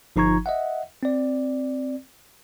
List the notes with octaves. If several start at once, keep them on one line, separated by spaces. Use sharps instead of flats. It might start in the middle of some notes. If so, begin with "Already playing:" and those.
G1 F3 D#4 A#5 C#6 G#6
D#5 E5 F#5
C4 D5